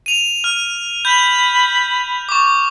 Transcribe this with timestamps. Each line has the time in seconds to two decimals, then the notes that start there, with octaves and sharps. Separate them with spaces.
0.06 D#7 F7
0.44 F6
1.05 B5 G6
2.29 C#6 D6